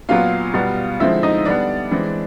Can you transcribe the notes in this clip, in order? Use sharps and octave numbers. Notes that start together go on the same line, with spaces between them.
A#2 F#3 B3 F4 F5
B2 G3 B3
D3 F3 G#3 C4 E4 E5
D#4 D#5
D3 G3 B3 D4 D5
E3 G#3 C4